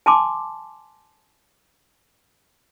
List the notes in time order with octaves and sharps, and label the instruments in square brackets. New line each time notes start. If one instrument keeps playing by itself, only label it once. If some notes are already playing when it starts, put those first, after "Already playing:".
[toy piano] G#5 A5 C6 D6